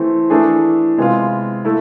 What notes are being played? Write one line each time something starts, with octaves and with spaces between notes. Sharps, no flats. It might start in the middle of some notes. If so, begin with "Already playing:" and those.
Already playing: E3 A3 C4
E3 A3 D4 G#4
C3 G#3 B3 F4
A3 E4